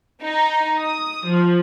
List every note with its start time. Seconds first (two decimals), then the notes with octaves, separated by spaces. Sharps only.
0.22 D#4
0.77 D#6
1.27 F3